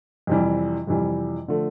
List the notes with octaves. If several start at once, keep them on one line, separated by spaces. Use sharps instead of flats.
F2 C3 E3 G3
F2 C3 E3 G3
D3 F3 A3